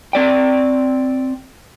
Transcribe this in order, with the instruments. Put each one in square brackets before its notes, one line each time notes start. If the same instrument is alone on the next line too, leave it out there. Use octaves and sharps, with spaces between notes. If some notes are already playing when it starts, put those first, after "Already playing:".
[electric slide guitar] C4 D5 G5